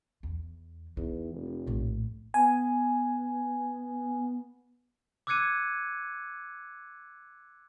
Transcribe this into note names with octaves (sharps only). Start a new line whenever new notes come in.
E2
E2 D#4
F1
A#1 A2
B3 G#5
D6 E6 F#6 G#6 C#7 D#7